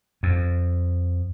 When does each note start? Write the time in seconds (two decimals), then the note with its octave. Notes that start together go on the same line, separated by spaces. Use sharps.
0.23 F2